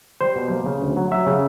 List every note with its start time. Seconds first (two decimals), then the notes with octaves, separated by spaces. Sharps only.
0.21 G3 C5
0.36 B2
0.51 A#3
0.66 C#3
0.81 D2
0.97 F#3
1.11 F#3 E5
1.27 C#3